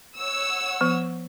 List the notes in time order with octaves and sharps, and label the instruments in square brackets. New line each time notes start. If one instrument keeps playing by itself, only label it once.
[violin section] C#5 F#5 E6
[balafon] F3 B3